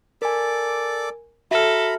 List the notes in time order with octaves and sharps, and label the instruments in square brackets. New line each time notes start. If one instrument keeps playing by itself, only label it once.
[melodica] A4 D5 D6 [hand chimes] A#4 G#5
[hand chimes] F#4 F6 [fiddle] A4 [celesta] E5 [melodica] A#5 B5